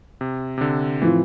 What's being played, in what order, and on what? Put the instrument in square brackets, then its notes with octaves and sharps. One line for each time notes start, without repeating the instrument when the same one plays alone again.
[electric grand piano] C3
C3
D3
[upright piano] A2 F3 C4 F4 [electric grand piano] E3